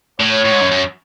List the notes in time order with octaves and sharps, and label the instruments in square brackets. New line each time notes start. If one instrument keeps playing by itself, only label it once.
[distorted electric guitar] A2 [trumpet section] C#5
[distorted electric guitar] A2
G#2
F#2
F#2